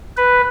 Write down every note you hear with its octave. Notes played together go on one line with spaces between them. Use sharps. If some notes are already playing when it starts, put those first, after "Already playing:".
B4